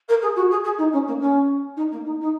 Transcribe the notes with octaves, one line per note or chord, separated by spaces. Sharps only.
A#4
G#4
F#4
G#4
G#4
D#4
C#4
A#3
C#4
D#4
A#3
D#4
D#4